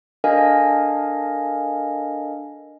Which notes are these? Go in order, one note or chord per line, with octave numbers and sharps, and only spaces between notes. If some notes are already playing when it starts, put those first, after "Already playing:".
D4 A4 A#4 D#5 F5 G#5